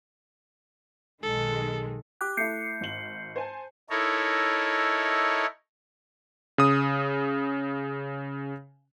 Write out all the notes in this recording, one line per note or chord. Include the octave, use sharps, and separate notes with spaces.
B1 D#3 G#3 A4
G4 D6 F#6
A3 E4 G6 C7 C#7
G#1 F#7
C5 G#5 A5
D#4 E4 A4 A#4 C#5
C#3 D#6